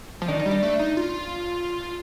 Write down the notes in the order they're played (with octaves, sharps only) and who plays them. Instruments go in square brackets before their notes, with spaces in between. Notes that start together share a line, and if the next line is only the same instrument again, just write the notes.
[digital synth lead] F3
[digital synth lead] D#3 [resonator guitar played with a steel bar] D4
[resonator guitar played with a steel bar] D#4
[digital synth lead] G3
[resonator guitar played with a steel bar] D4
[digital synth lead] A3
D#4
F4